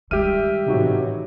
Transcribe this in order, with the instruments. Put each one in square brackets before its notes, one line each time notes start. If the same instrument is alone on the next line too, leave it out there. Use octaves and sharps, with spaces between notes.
[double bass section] G2 [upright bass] D#3 G#3 [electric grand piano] G4 E5 D#7 [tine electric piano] F6
[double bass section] A1 G#2 F#3 [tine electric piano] C3 D#4 F#4